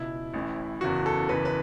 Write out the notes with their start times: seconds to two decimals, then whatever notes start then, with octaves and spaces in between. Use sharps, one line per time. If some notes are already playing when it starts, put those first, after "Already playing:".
Already playing: C#2 B2 E4
0.34 A1 A2 E3
0.81 F#1 E2 C#3 E3 F#4
1.06 A4
1.29 F#1 E2 E3 B4
1.45 B4